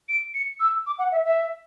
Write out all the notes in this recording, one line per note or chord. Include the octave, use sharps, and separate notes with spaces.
D7
C#7
E6
D6
F#5
E5
E5